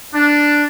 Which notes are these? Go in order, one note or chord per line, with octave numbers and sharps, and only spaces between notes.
D4